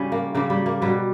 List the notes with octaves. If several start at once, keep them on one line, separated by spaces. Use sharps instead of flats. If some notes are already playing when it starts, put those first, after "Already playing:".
Already playing: C#3 G3 C#4
A#3
C#3 G3 A#3
G3
A#3
B2 F#3 G3